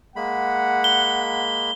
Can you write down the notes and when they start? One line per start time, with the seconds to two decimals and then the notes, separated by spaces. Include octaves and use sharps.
0.16 G#3 A#3 F#5 B5
0.84 G7